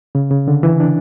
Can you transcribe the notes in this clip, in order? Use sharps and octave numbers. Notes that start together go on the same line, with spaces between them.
C#3
C#3
D3
E3
D4